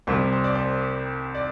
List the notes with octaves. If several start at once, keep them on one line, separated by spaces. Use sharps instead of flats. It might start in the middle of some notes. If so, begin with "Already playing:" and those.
C2 C3 G3 C5
C5
D5
C5
D5